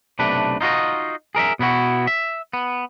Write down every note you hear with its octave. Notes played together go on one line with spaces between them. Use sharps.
B1 C3 A3 D4 B4
D#4 F4 F#4 D#5
G#4 A#4 D#5 E5
B2 B3 E4 F#4
E5
B3